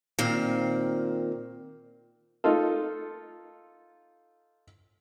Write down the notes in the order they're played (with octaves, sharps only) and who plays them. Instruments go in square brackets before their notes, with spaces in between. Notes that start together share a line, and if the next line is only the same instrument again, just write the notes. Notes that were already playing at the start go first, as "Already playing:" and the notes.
[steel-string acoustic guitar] A#2 D#3 C4 F5
[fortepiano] D#4 F4 A4